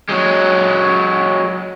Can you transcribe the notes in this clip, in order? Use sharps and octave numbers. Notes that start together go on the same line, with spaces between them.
F#3 G#3